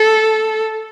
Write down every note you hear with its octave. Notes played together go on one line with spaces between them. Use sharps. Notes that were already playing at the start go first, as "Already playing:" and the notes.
Already playing: A4